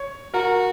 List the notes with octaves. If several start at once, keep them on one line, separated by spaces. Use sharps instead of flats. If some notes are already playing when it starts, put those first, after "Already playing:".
Already playing: C#5
F#4 A#4